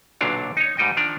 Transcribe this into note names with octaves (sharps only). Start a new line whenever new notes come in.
B1 A#2 D3 F#3 D4 F5
D#4 C#5
G#2 G3 D#4 D#5 G5
D#3 F3 D4 D5 A#5